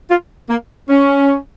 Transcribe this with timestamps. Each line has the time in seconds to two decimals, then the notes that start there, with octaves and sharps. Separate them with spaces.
0.10 F4
0.49 A#3
0.89 C#4